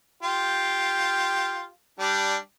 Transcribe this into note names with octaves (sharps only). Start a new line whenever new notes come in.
F4 G4
G3 D4